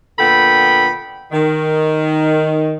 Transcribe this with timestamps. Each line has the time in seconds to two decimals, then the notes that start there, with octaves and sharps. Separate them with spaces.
0.19 A#2 D3 B3 A4 G5 B5
1.32 D#3